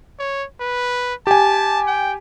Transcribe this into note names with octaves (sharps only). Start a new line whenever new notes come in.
C#5
B4
G4 G#5 A5
G5